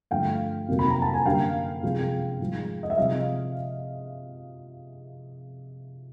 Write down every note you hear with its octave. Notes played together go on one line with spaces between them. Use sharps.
G2 D3 F3 A3 F5 G5
F2 C3 D#3 F#3 A#3
B5
A#5
A5
G#5
F#2 D3 G3 A#3 F5 G5
C3 F3 G#3
G#2 F3 G#3
D#5
E5
C3 F3 G#3 D#5 F5